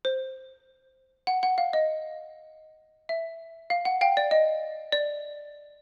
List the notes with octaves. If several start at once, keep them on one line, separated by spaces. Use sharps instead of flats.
C5
F#5
F#5
F5
D#5
E5
F5
F#5
F5 G5
D5
D#5
D5